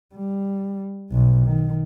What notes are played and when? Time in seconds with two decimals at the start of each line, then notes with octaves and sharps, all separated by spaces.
0.15 G3
1.11 B1 B2
1.45 D#3